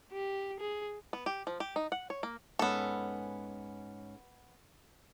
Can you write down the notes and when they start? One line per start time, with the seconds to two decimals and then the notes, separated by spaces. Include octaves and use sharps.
0.12 G4
0.60 G#4
1.13 B3
1.26 G4
1.47 F3
1.60 G4
1.76 D#4
1.92 F#5
2.10 C#5
2.23 A#3
2.59 G#2 B3 C#4 A4